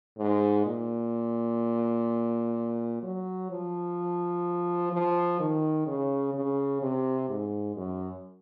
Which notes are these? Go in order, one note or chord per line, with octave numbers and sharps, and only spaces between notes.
G#2
A#2
F#3
F3
F3
D#3
C#3
C#3
C3
G#2
F#2